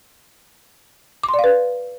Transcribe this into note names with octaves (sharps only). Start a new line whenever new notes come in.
D6
C6
D5
F5
B4